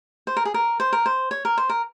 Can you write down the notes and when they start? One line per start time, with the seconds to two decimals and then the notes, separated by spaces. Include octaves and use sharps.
0.27 C5
0.37 A#4
0.45 G#4
0.54 A#4
0.80 C5
0.93 A#4
1.06 C5
1.31 C#5
1.45 A#4
1.57 C5
1.69 A#4